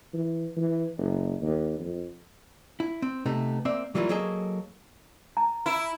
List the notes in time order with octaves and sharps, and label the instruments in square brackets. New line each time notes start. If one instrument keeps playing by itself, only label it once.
[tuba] E3
E3
F#1
D#2
F2
[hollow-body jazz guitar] E4
C4
C3 A3 B3 D#4
A#3 C4 D5 E5
E3 F#3 G3 A#3 E4 F4
F#3 A#3 G#4 A4 D#5
[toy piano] A#5
[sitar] E4